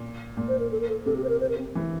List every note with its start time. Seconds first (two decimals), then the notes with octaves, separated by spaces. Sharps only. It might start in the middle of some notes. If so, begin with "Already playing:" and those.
Already playing: A#2
0.37 A#2
0.48 C5
0.59 A#4
0.71 A4
0.80 A#4
0.89 A4
1.06 C3 A4
1.17 G4
1.24 C5
1.29 A#4
1.41 C5
1.49 A#4
1.58 C4
1.75 E3